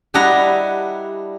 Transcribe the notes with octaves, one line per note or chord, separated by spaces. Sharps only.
G3 D4 E4 D#5 F#5 A#5